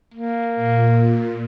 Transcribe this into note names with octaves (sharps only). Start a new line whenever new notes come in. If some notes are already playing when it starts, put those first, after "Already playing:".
A#3
A#2